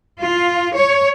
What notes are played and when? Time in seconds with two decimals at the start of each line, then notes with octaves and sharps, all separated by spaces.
0.22 F4
0.74 C#5